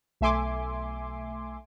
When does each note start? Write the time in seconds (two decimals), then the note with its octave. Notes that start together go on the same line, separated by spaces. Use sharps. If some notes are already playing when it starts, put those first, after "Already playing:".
0.21 B1 A3 E5 G#5 C6 D6